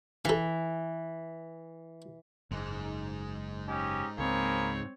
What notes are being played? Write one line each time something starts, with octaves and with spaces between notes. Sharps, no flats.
E3 A4 F5
F#1 G#2 G#3
C#4 D#4 G4
C#2 A#3 C4 G#4 C#5 B5